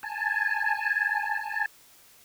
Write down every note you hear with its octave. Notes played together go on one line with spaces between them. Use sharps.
G#5 A5